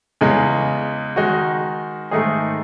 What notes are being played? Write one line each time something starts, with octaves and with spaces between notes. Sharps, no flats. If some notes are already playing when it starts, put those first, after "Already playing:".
E2 C#3 G#3
D#3 G#3 D#4 F#4
G#2 D#3 A3 D#4 G#4